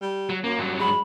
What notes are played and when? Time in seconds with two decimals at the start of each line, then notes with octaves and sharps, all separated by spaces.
0.02 G3
0.30 F#3
0.44 F#2 A#3
0.58 G2 F#3
0.79 G#3 B5